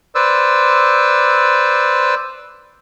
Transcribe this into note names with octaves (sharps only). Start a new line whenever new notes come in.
B4 C5 D5 E6